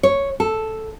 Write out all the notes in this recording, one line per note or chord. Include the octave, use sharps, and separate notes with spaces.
C#5
A4